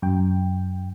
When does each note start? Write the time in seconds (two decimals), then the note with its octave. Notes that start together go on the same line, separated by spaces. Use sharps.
0.02 F#2 G5